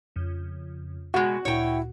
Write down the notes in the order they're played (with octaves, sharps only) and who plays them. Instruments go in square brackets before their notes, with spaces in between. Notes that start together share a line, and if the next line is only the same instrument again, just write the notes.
[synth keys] F2 C#3
[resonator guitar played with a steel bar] B2 G#3 [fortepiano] F#4
[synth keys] D2 A#2 [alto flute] E4 [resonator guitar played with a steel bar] C#5 G5